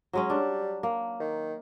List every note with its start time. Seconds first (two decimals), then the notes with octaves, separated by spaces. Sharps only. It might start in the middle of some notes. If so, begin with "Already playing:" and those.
0.13 F#3 G#3 C#4
0.30 G3 D4
0.83 A#3
1.20 D#3